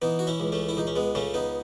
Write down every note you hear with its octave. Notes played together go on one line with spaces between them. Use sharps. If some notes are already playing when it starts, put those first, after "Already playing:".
E3 B3 D#4
F#4
C#4 E4
C#2
A3 C#4
E4
C#2 D#4
C#4
G#3 B3
C#3 A3 C#4
B3 D#4